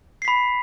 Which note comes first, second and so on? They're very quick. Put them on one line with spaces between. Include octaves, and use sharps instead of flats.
C7 B6 B5